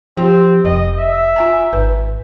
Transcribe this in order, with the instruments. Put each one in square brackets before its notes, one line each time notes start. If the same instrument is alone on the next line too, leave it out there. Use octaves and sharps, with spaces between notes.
[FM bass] F3 [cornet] C4 [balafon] G4
[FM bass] F1 [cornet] D#5
[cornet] E5
[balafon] F4 G#5 A#5
[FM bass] G#1 [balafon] B4